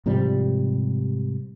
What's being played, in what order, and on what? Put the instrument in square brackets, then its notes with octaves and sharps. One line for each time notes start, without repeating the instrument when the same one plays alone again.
[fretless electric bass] G#2 C3 F3 G3